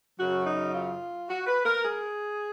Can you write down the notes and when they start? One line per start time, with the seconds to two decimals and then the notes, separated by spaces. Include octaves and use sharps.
0.18 F#2 C#3 F#3 F#4
0.47 D#4
0.73 F4
1.29 F#4
1.47 B4
1.65 A#4
1.84 G#4